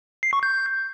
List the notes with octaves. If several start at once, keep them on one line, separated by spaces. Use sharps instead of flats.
C7
C#6
G6